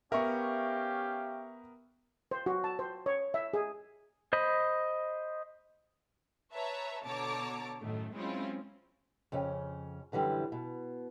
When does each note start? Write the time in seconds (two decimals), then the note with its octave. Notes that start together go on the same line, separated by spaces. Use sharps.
0.12 B3 C#4 G4 A#4 E5 F5 C#6
2.31 C5
2.46 F#4
2.64 A5
2.79 C5
3.06 C#5
3.34 E5
3.54 G#4
4.33 C5 D#5 B5
6.54 B4 C#5 E5 A5 A#5
7.04 B2 D3 C#5 A5 A#5 D6
7.81 F#2 A2 D#3 A3
8.14 F#3 G#3 C4 C#4 E4 F4
9.32 F2 C#3 C#4
10.12 F#2 D3 E3 G3
10.52 B2